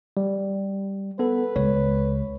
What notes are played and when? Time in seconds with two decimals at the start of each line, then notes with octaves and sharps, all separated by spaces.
0.17 G3
1.19 B3 A4 B4
1.56 C#2 C#5